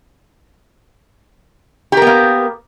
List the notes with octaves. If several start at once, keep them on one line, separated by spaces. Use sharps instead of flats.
A#3 B3 G4 A#4